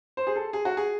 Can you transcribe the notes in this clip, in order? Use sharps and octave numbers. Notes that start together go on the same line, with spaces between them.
C5
G#4
A4
G#4
F#4
G#4